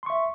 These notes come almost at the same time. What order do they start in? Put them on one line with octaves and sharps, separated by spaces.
C6 C#6 E5